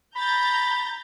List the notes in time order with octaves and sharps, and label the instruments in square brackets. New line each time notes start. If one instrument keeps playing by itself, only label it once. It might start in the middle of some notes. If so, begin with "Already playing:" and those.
[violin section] A#5 G6 A6 [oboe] B5